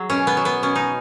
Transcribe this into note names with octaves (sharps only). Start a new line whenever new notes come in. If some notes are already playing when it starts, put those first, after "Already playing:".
Already playing: F#3 G#4
B2 C#4
B3
F#3
B3
B2 C#4
D#4